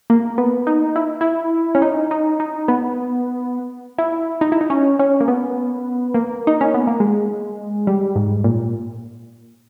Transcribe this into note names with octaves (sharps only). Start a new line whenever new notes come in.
A#3
B3
D#4
E4
E4
C#4
D#4
D#4
D#4
B3
E4
D#4
E4
D#4
C#4
C#4
A#3
B3
A#3
D#4
C#4
B3
A#3
G#3
G3
G#2
A#2